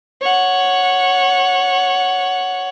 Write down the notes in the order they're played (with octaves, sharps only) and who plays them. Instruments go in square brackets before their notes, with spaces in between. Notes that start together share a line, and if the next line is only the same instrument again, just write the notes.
[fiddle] C#5 F#5